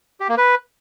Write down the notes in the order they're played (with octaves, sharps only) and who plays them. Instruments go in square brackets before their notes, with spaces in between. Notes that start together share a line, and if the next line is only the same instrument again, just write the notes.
[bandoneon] G4
A#3
B4